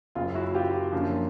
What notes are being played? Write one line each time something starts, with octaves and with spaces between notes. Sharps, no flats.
F#1 F#2 C#3 F4
E4 F#4
F4 G4
F4
F#2 D3 F3 A#3